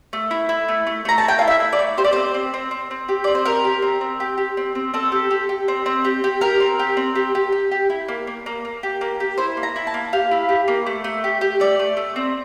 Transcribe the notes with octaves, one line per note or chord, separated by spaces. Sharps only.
A3
E4
E4
A3
A3
A3 A#5
A5
E4 G5
E4 F5
E5
E4
D5
A3
G4 C5
D5
C4 C5
C4
C4
C4
C4
G4
C4 D5
C5
G4 A#4
G4
C4
C4
G4
G4
C4
C4
C4 A4
G4
G4
G4
C4
C4
G4
G4
G4 A#4
C4
G4
C4
G4
G4
G4
G4
E4
A#3
A#3
A#3
A#3
G4
A#3
G4
E4 C5
A#3
A#5
E4
A5
A#3
G4 F5
E4
G4
A#3
A3
A3
G4
G4
A3 D5
A3
A3
C4